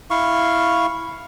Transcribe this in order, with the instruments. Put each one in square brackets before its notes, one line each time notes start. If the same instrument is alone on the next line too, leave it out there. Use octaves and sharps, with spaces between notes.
[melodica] E4 F5 C#6